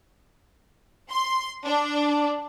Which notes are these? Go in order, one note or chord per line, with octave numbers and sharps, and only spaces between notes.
C6
D4